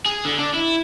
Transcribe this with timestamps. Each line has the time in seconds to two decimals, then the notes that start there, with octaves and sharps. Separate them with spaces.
0.06 G#4
0.25 D3
0.39 D4
0.54 E4